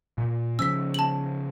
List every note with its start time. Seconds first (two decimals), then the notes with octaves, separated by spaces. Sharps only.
0.18 A#2
0.59 C#3 F3 C#4 E6 B6
0.94 A5 F#7